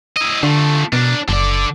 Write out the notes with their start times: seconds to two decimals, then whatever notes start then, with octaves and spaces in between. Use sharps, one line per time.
0.17 E4 D#5
0.43 D3 F3 A3
0.93 B2 D4 A#4
1.29 F#1 D3 D5